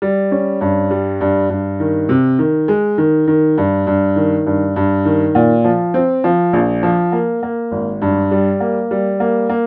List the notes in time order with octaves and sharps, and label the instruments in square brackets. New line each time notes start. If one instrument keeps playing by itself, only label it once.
[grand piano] G3
C#4
G2
G3
G2
G2
D#3
C3
D#3
G#3
D#3
D#3
G2
G2
D#3
G2
G2
D#3
A#2
F3
C4
F3
A#1
F3
A#3
A#3
G#1
G2
G3
A#3
G3
A#3
A#3